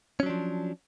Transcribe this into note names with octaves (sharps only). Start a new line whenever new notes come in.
F3 F#3 C#4 D4